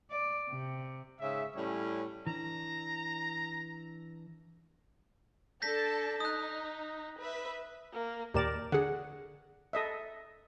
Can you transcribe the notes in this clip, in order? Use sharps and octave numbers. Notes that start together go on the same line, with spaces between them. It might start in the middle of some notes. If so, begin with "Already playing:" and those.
D5
C3
G#2 C#3 E5
A2 G3 C#4
E3 D4 A#5
D4 A4 A5 G6 A#6 B6
D#4 D#6 F#6
B4 E5
A#3
D#2 A#2 G4 A#4 D5 E7
D3 G#4 F#5
A4 D#5 E5